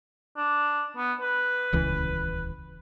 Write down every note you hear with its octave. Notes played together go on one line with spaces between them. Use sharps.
D4
B3
B4
D#1 C#2 E3